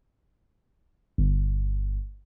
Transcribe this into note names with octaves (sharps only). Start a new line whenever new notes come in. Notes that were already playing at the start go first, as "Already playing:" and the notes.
G1